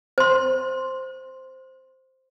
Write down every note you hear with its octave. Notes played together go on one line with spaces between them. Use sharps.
C5 C6